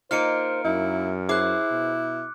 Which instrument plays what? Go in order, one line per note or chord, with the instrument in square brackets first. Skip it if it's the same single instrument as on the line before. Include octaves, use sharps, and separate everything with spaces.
[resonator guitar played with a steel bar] A#3 D#4 F4 [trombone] C5 [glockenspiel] F6 C#7 D7
[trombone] F#2 [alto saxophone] E4
[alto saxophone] E4 [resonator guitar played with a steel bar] G#4 C5 [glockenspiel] D6 F#6
[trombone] B2